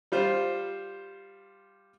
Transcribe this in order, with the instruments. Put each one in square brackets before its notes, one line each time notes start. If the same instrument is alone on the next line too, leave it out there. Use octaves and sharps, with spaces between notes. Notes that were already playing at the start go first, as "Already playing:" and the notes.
[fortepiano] G3 F4 C5